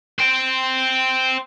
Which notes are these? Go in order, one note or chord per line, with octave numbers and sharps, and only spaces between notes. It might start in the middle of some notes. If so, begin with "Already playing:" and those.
C5 G5